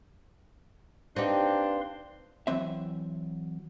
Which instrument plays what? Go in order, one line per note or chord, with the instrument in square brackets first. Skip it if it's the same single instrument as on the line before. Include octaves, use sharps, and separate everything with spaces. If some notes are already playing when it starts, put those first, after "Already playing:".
[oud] C4 D#4 G4 [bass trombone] D4 [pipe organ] B4 F5 C6
[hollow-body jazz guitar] E3 F#3 C4 E5